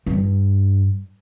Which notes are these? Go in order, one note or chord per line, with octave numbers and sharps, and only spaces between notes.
G2